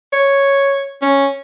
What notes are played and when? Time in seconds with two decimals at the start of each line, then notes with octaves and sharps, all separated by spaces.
0.13 C#5
1.02 C#4